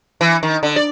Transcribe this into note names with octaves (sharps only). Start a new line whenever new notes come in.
E3
D#3
D3
D5